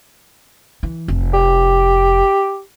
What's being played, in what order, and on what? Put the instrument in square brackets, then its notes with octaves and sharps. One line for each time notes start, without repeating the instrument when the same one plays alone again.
[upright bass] E3
F1
[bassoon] G4